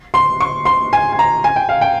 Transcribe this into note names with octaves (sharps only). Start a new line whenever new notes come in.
C6
C#6
C6
G#5
G#5
A#5
G#5
G5
F5
G5